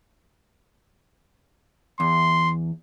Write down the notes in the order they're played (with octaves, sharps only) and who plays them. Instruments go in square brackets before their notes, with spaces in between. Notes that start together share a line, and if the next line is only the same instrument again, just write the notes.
[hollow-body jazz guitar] E2 [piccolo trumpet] C6